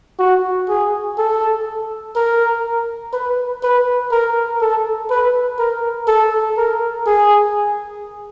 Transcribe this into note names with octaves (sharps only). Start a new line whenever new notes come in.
F#4
G#4
A4
A#4
B4
B4
A#4
A4
B4
A#4
A4
A#4
G#4